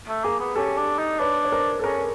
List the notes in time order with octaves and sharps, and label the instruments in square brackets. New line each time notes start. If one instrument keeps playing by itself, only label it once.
[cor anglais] A3
[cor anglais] A#3 [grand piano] G#4
[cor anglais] B3
[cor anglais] C#4 [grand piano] G4 A4
[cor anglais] D4
D#4
[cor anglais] D4 [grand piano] B4 C#5
[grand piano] C#5
A#4 C5
A4
[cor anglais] C#4 [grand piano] G#4 A#4